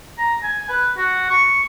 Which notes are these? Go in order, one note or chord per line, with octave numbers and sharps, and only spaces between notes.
A#5
G#5
B4
F#4
C#6